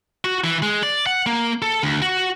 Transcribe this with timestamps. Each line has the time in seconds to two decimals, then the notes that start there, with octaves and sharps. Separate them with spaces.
0.24 F#4
0.44 E3
0.62 G#3
0.83 D5
1.06 F#5
1.26 A#3
1.62 A4
1.83 D2
2.02 F#4